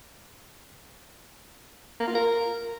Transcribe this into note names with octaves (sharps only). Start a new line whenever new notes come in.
A#3
F4
A#4